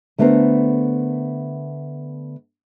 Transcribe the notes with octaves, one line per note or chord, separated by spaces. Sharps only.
D3 A3 B3 A#4 C5